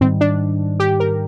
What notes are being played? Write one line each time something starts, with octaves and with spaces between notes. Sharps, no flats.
G#2 D#3 G3 C4
D4
G4
A#4